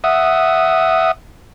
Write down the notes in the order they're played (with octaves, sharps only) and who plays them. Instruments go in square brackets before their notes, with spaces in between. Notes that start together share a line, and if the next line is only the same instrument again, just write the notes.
[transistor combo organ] E5 F#5 D#6